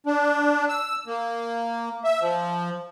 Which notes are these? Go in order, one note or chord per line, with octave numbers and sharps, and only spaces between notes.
D4
E6
A#3
E5
F3